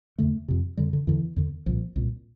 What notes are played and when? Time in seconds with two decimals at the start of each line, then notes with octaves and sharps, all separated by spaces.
0.18 E2 D3 A3
0.48 F2 C3
0.77 F2 D3 G3
0.93 D3
1.07 E2 D3 E3
1.36 E2 D3
1.66 C2 A#2 F3
1.96 C2 A#2